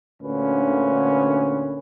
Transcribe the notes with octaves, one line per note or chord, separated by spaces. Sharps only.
D2 A#2 D3 C#4 B4